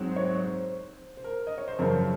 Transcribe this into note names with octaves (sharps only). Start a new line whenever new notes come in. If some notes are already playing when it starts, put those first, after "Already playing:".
Already playing: G#2 F#3 C4
C5
C#5
C5
C5
A#4
D#5
C#5
C5
F#2 C#3 F3 A#4